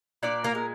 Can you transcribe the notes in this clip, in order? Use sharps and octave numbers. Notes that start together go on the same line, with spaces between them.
A#2 D4 D5
A#3 A#4
G#3